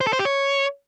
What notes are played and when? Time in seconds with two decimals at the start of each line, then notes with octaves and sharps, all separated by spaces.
0.01 C5
0.07 A4
0.13 C5
0.19 G4
0.25 C#5